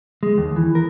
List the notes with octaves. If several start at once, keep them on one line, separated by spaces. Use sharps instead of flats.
G#3
D#2
E3
A#4